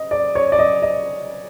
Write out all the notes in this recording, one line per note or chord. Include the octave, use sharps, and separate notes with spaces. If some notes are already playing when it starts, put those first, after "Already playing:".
Already playing: D#5
D5
C#5
D5
D#5
D#5